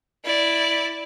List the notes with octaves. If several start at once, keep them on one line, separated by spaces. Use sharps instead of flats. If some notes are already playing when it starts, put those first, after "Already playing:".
E4 D5